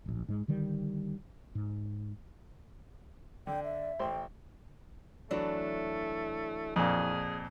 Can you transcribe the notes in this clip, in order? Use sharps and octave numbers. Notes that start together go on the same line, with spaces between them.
D1 A#1
G#2 G#3
D3 D#3 G3
G#2
D3 D5 G5
E5
A1 C5 G5 C6
E3 F#3 A3 D4
F2 A#2 G#4